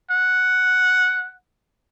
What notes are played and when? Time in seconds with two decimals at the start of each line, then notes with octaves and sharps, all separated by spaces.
0.10 F#5